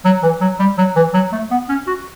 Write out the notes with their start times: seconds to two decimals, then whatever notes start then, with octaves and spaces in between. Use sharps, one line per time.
0.05 F#3
0.23 E3
0.41 F#3
0.59 G3
0.78 F#3
0.96 E3
1.14 F#3
1.32 A3
1.51 B3
1.69 C#4
1.87 F#4